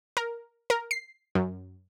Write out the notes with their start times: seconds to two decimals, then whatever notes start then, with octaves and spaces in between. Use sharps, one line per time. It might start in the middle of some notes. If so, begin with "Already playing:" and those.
0.17 A#4
0.70 A#4
0.91 C7
1.35 F#2